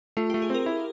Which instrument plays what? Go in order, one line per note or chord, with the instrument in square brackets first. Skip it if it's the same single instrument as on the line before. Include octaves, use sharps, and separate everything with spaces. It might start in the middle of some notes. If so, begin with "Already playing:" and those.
[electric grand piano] A3 [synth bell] F4
[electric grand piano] A3 [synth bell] G4
[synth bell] G#4
[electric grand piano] C4 [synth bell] A#4
[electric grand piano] E4